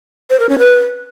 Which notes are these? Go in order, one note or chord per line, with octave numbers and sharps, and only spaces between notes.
C5
A#4
C#4
B4